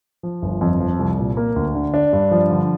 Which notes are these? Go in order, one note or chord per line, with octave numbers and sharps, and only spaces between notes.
F3
G1
F2
F3
C2
A#2
A#3
D2
D3
D4
G2
F3
D3